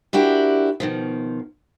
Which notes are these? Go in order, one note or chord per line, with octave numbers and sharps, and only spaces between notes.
D4 E4 F#4 G4 A#4
B2 D#3 F3